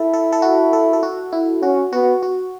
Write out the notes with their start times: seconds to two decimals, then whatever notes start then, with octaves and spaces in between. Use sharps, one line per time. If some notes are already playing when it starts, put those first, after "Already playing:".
Already playing: E4 A4
0.13 A4
0.32 A4
0.42 F#4
0.73 A4
0.93 A4
1.03 F#4
1.32 E4
1.62 C#4 F#4
1.93 B3 F#4
2.23 F#4